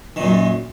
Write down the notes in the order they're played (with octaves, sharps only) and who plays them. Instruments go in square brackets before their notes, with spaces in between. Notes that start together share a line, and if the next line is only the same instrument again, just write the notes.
[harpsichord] D#3
A#2
F#2